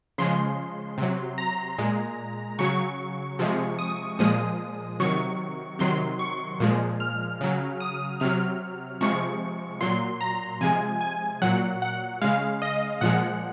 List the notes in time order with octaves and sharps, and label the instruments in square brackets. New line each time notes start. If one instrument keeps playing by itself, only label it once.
[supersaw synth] C#3 F3 G#3 C6
C3 F#3
A#5
A#2 G#3
C#3 F#3 C#6
C3 F3 G#3
D#6
A#2 F3 G#3 D#6
C3 D#3 F#3 C#6
C3 D#3 F#3 C6
C#6
A#2 F3 G#3
F6
C#3 F#3
D#6
C3 F#3 F6
C3 F3 G#3 C#6
A#2 F#3 C6
A#5
C3 F3 G#3 G#5
G#5
A#2 F#3 F#5
F#5
C#3 G#3 F5
D#5
A#2 F3 G#3 F#5